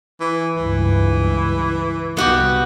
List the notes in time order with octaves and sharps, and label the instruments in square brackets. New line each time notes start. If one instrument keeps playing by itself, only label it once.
[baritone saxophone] E3
[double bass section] C#2 G2 [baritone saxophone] E3
[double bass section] C2 [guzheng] B3 F#4 G4